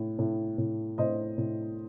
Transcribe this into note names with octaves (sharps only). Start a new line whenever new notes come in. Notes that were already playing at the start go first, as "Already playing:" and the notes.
Already playing: A2
A2
A2
A2 C5 D#5
A2